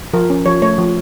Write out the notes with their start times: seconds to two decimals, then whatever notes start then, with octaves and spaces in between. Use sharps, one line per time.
0.14 F3 A#4
0.30 C#4
0.46 F3 C#5
0.62 A3 C#5
0.78 F3